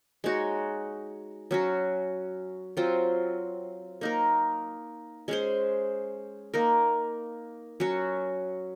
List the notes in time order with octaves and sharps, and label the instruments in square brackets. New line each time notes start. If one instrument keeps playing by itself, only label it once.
[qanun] G#3 D#4 F#4 C#5
F#3 C#4 F#4
F#3 C4 F4
A#3 D#4 A#4
G#3 C#4 G#4 C5
A#3 D#4 A#4
F#3 C#4 F#4 C#5